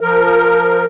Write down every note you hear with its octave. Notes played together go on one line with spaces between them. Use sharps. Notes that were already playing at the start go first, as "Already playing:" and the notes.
F3 A#4